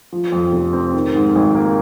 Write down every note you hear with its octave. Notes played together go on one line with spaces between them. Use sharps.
F3
F2
F1
C4
D#3
G#2
G#1
A#3